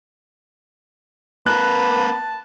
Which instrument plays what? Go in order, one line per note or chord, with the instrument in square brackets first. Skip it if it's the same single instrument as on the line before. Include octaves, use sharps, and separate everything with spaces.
[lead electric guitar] B3 A#4 [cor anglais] B4 [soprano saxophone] A5 [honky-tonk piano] F#6